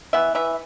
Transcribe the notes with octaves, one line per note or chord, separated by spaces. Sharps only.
E3 B3 E5
E3 E5